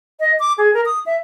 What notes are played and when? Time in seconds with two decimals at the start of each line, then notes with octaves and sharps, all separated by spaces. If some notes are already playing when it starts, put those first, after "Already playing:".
0.20 D#5
0.40 D6
0.58 G#4
0.74 A#4
0.86 D#6
1.06 E5